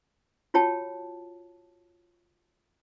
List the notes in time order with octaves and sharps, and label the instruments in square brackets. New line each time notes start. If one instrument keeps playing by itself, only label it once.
[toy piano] F4 F#4 C#5 G5 A5